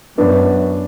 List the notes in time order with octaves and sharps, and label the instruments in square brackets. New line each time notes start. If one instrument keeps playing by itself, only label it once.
[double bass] F#2 [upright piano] B3 D4